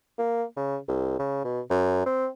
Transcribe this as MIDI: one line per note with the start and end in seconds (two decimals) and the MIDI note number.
0.18 0.44 58
0.57 0.77 49
0.88 1.16 36
1.19 1.41 49
1.45 1.61 47
1.71 2.03 42
2.06 2.28 60